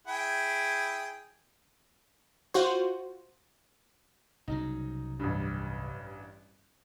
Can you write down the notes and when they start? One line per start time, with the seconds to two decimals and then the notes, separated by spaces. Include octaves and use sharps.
0.07 E4 G#4 G5
2.54 F4 F#4 C5
4.48 C2 C#3 F#3 D#4
5.19 A1 G2